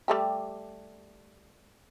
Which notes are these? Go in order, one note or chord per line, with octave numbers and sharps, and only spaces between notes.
G3 A3 G4